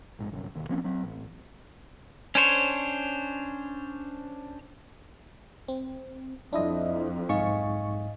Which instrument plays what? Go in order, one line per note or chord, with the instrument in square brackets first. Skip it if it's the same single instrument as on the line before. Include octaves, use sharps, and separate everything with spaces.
[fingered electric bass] A#1 G#2
G1 C2 F#2
E1 D#2
F3 A#3 C4 C#4
F#3 C4
A1
[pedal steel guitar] C#4 D4 C5 C#5
[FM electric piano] C4
[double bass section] F2 [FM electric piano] D4 E4 D#5
[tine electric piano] B1 G#2 [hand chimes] D#5 F5 G#5 [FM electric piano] C#6